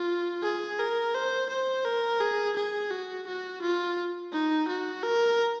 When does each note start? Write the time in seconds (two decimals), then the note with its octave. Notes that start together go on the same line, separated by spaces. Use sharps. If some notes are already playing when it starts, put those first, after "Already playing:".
Already playing: F4
0.43 G#4
0.79 A#4
1.15 C5
1.50 C5
1.85 A#4
2.20 G#4
2.56 G#4
2.91 F#4
3.27 F#4
3.62 F4
4.33 D#4
4.68 F#4
5.03 A#4